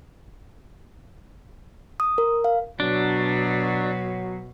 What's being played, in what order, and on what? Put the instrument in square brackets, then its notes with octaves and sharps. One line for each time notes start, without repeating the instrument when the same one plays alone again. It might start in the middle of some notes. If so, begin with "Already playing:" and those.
[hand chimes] D#6
A#4
F5
[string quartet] B2 [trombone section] F#3 [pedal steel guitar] D4